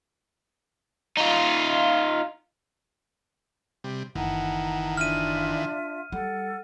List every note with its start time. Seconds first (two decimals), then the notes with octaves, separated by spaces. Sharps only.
1.17 D#4 F4
3.84 C3 G3
4.15 F#1 D#3 E3 F#5 A5 A#5
4.97 D4 F4 E5 F6 D#7
6.12 G3 A4 F#5